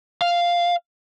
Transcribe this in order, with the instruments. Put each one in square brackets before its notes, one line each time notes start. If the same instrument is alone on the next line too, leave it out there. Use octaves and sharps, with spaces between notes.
[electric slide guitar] F5